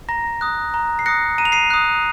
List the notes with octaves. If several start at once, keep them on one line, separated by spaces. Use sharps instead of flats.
A#5 A#6
D#6 F#6
A#5
C7
D#6 F#6 A#6 C#7
A#5 D#7
F7
C7 D#7
D#6 F#6